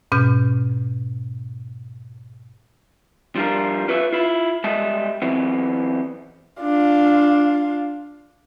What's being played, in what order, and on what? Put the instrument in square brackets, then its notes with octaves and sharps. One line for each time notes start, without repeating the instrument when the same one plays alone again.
[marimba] G#2 B2 C#4 F6 G6
[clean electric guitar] F3 G3 D4 F4 A#4
F4 B4 C#5 E5
E4 F4
G3 G#3 D#5 E5 A5
E3 F#3 B3 C4
[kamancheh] D4 F4